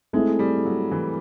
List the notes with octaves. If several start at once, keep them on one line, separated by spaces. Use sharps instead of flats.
G#3 A3 C4 E4 G#4
G3
F#3
E3